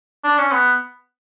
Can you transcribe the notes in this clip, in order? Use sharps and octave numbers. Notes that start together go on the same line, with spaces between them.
D4
C#4
B3